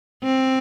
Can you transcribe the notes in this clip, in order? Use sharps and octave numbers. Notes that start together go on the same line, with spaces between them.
C4